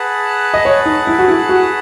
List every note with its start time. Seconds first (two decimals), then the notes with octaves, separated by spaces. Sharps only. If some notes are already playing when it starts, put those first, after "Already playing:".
Already playing: G#4 B4 F#5 A5
0.54 D#5
0.65 C#5
0.86 D#4
1.07 E4
1.19 F#4
1.28 E4
1.49 F#4